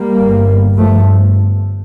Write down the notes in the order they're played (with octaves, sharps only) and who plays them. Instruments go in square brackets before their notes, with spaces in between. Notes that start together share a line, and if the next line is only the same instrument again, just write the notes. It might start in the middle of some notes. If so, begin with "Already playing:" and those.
Already playing: [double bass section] G3 A#3
G1 G2
G1 G2 F3 A3